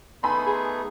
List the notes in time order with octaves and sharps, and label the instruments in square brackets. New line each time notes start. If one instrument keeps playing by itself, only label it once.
[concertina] A3 B3 D#4 [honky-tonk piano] G#5 B5 C6
[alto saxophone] G#4